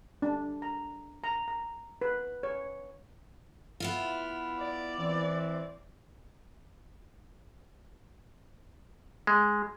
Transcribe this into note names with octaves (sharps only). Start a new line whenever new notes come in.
D4
A#5
A#5
A#5
B4
C#5
B3 E4 F4
D5
E3 C4
G#3